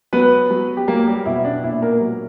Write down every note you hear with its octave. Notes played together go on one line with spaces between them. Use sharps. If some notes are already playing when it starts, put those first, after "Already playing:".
F#3 B3 B4
F#3
G4
F#3 A#3 A#4
G3 G4
B2 E4
D4
A#2 E4
A#3 A#4
F#3